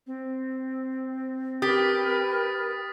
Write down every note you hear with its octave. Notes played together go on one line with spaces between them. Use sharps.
C4
G4 A#4 B4 G5 D#6 A6 B6